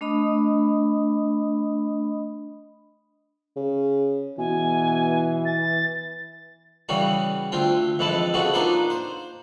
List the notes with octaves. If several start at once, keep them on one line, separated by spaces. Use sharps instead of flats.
A3 D4 D#5 B5 D#6
C#3
B2 E3 G#5
A6
C#3 E3 G3 F#4
D2 C4 F4 G5
F2 E3 G#3 B4 A5
C#3 G#3 B3 C4 F#4 A4
A#3 D4 D#4 F4 B4 C5
C5